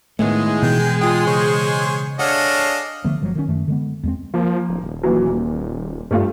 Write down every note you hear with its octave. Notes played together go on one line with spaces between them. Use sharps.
A2 D#3 G#3 A3 B3
B2 E3 G5
F4 G5 D#6
C#3 C5 C#5
D4 G#4 A4 C#5 D#5 F5 F#5
D3 F3 A3 B3
G1 F3 F#3 G#3
D#3 E3 C#4
F#2 D#3 A3
D3 G#3 B3
E2 G#3 C4
F3 A#3
D1
D#1
A#2 E3 F#3
A#2
G2 G3 A3 F4